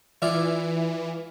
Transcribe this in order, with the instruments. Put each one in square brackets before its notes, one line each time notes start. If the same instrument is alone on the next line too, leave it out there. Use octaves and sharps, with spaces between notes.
[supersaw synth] E3 [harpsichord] E4 F4 D5